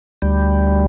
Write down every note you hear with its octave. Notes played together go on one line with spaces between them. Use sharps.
D2 G3